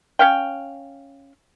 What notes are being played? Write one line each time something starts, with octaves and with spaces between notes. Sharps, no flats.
C#4 F5 G5